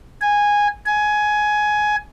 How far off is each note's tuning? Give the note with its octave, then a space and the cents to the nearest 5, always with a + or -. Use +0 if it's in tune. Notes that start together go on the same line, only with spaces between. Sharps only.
G#5 -10
G#5 +15